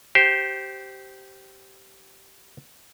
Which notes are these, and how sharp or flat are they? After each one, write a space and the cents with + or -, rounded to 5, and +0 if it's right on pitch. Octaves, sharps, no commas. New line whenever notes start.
G4 -15 C5 +0